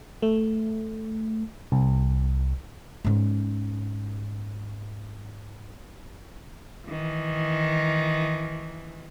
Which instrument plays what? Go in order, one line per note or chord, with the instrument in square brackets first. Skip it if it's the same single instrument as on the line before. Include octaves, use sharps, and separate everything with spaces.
[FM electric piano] A3
C2
[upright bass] G#2 C#4
[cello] D#3 E3